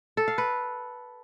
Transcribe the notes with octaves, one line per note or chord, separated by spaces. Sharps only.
A4
F5
B4